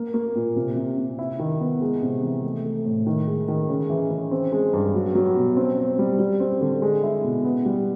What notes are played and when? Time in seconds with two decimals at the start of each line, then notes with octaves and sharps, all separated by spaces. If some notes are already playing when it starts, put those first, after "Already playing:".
Already playing: A#3
0.14 A#3
0.35 A#2
0.56 C3
0.76 C3
0.98 C3
1.19 E4
1.39 D#3
1.61 B3
1.81 G#3
2.02 C3
2.23 E3
2.44 A3
2.64 A3
2.86 A2
3.07 D#3
3.27 G#3
3.48 D#3
3.69 C#3
3.90 E3
4.11 C#3
4.31 C4
4.52 G#3
4.73 G2
4.94 F#3
5.15 F#3
5.36 B2
5.57 C4
5.78 C4
5.99 G3
6.19 G3
6.40 C4
6.61 D3
6.82 G#3
7.03 E4
7.24 B2
7.45 B3
7.65 G3